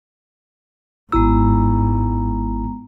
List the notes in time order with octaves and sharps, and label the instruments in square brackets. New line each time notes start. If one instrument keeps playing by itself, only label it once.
[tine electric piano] G#1 E4 E6 [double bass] G#2 [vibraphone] G#3 B3 A#5